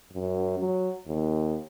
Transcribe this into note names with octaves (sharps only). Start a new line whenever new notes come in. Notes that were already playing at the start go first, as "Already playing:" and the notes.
F#2
F#3
D#2